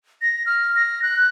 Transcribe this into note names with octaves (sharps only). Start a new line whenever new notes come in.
A#6
F6
A#6
F#6